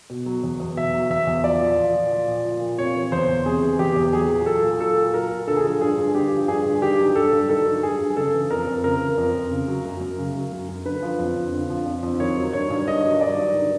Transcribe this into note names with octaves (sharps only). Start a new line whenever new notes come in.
B2
F#3
E2
E2
B2 E5
F#3
E2 E5
E2
F3 D5
A#2
F3
A#2
F3
A#2
F3
A#2
C3 C#5
E3
E2 C5
E2
C3 G#4
E3
E2 G4
E2
F#3 G#4
A#2
F#3 A4
A#2
F#3 A4
A#2
F#3 A#4
A#2
D3 A4
G#4
F3 A4
G2 G#4
G2
D3 G4
F3
G2 G#4
G2
D#3 G4
F#3
G2 A4
G2
D#3 A4
F#3
G2 G#4
G2
C#3 A4
E3
F2 A#4
F2
C#3 A#4
E3
F2
F2
C#3
F#3
F#2
F#2
C#3
F#3
F#2
F#2
D3 B4
F3
F2
F2
D3
F3
F2
F2
D#3 C#5
F#3
G2 C#5
G2
D#3 D#5
F#3
G2 D5
G2
D#3